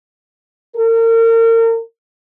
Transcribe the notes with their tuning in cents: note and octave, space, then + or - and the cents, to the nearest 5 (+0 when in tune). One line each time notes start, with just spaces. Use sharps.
A#4 -35